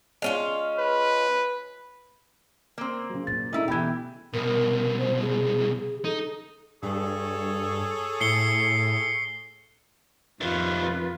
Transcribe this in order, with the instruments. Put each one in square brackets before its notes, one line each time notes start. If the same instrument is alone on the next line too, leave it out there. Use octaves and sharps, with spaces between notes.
[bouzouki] G#3 C#4 F4
[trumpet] B4
[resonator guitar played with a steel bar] A#3 C4
[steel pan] C#3 F#3
[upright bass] A#2 [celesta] A6
[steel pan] C#3 A3 [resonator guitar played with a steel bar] D#4 E4
[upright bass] B2 [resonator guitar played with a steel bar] E3 G4 [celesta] G5 B5 G#6
[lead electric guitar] C2 B2 [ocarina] A#4
[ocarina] C5
G#4
[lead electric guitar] D#4 [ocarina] A4
[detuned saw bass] G2 [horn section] G#4 A4 C#5
[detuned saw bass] A2 [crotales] C7 C#7 G7
[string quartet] F2 [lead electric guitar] C3 D#3 [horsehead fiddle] F4 B4